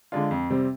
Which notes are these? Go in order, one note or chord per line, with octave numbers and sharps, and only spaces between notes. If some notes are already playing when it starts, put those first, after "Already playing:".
D3 G#3 D4 F4
F2
C3 G3 C4